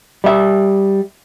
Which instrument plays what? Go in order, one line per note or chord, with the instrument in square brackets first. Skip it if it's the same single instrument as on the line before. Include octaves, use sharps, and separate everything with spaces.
[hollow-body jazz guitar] G3 E5